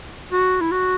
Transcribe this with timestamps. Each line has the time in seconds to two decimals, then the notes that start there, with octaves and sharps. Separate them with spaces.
0.32 F#4
0.61 E4
0.72 F#4